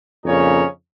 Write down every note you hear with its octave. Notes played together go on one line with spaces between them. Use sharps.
F2 A#2 C#3 C#4 D#4 C#5